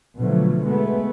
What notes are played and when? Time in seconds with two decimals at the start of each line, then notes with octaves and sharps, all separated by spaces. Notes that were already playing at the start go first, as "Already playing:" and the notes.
0.19 B2 D3 F3 F#3 A3
0.67 G#3 A3 B3